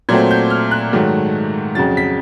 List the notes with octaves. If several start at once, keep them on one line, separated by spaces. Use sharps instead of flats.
A#2 F#3 A3 C4 G#6
G6
F6
F#6
G#2 D#3 F#3 A3
F2 C#3 F#3 A6
B6